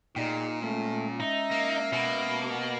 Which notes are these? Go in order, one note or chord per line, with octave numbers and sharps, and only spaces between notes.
A#2 D#4 G#4 D5 G5
G#3 A3 C#4
D#4 E5
A#3
B2 A#3